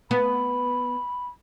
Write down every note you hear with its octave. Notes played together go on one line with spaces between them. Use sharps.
B3 B5